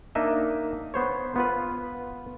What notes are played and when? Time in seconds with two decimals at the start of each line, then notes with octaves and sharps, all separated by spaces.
0.15 A#3 D4 D#4 D#5 E5
0.94 B3 C5 C#5
1.36 B3 F4 B4